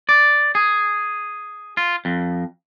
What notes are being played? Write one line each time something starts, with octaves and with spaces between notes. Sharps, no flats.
D5
G#4
F4
F2